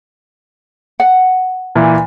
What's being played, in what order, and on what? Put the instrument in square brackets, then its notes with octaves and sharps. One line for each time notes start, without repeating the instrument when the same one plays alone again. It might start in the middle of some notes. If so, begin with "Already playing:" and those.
[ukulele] F#5
[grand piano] A#2 E3